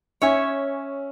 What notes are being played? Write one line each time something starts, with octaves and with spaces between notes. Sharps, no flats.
C#4 C#5 E5 G#5 C#6